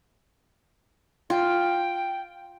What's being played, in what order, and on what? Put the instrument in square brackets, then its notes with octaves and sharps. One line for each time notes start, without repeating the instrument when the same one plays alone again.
[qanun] F4 [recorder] G5